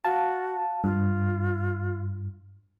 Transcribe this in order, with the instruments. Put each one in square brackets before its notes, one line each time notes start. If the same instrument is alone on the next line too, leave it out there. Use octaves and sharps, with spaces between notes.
[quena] F#4 [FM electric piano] F5 A5
[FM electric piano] G2 [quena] F4